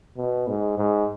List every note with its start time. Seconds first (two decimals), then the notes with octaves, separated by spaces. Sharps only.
0.17 B2
0.48 G#2
0.78 G#2